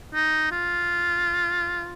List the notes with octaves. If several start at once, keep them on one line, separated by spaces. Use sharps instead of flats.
D#4
F4